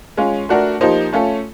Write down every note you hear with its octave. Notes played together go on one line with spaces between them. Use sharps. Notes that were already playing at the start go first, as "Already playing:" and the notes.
G#3 C#4 F4
A3 D4 F#4 A#4
F3 A#3 D#4 G4 C5
A3 C#4 F4 A4